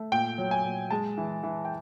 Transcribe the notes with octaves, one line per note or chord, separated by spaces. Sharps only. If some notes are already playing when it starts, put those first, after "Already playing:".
Already playing: A3
A#2 G5
F#3
G#5
A#2
G#3 A5
E3
E3
G5